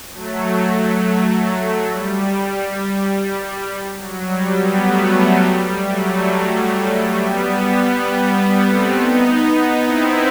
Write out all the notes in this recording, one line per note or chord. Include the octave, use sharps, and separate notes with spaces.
F#3 A3
G3
G3
F#3
G3
G3 B3
F#3 A3
F#3
G3
F#3 A3
G3 B3
G3 B3
G3
G3 B3
A3 C4
B3 D#4
C4 E4